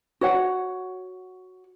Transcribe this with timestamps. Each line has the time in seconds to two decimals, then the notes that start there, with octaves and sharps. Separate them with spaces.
0.21 F#4 C#5 F#5